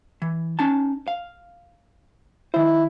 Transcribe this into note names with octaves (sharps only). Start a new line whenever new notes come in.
E3
C#4 D#4 A5
F5
D#3 E4 C5